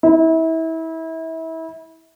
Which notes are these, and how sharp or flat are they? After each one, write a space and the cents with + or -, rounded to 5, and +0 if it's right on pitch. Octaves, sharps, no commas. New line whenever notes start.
E4 -30